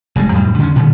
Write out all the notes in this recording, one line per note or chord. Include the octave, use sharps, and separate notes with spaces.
F1 G3 G#3
F2 A2 F#3 G3
D3 D#3 G3 C#4
A#2 D3 D#3 G3